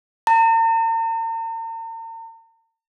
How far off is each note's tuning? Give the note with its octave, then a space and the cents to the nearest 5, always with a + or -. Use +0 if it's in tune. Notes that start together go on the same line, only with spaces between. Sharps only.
A#5 -45